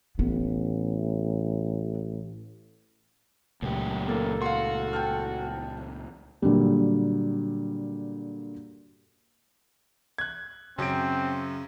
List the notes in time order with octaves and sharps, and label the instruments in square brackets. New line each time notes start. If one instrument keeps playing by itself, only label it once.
[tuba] A1 [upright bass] B3
[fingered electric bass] C#2 A#2 A3 [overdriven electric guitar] F#2 G4
[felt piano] A#3 [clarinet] A4
[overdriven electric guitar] F#4 [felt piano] F5 C6
[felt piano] G5 A5 F6
A#2 D3 F#3 G3
[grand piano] F#6 G#6
[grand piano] F#2 D7 [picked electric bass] C#3 [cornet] C4